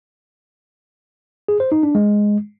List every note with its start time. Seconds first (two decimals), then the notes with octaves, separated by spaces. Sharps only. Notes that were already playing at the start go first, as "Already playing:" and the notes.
1.48 G#4
1.60 C5
1.72 D#4
1.83 D4
1.95 G#3